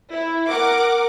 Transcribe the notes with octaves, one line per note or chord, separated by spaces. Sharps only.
E4
A#4 F#5 D6